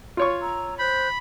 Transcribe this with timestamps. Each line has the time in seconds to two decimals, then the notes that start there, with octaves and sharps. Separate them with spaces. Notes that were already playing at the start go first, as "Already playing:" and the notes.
0.17 F4 C#5 C#6
0.41 A#5 E6
0.79 C5 B5 F#6 G6